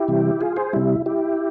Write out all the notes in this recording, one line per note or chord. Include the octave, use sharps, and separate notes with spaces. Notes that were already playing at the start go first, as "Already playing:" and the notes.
Already playing: E4 G4
C3 E3 G3
F4 G#4
G#4 C5
C3 G3 E4
E4 G4